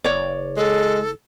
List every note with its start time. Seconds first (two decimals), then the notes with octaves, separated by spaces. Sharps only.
0.04 F#1 C#5 D5
0.57 G#3 A4